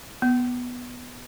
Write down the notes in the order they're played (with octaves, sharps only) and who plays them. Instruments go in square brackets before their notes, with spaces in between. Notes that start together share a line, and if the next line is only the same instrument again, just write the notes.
[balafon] B3